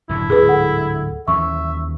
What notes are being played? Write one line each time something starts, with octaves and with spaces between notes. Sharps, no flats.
F#1 A2 D3 E4
D1 D2 G#2 G#4 B4
A4 F#5
D#2 E3 C#4 E5 C#6